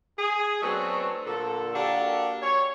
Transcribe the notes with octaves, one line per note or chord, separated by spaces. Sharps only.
G#4
F#3 A3 B3 C4 D4
A#2 D3 A4
A#3 D4 F#4 G4 A4
C#5